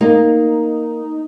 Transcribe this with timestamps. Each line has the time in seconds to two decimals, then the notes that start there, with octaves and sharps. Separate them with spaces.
0.01 A#3 D#4